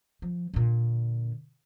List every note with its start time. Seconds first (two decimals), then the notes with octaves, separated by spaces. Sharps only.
0.22 F3
0.54 A#2 D3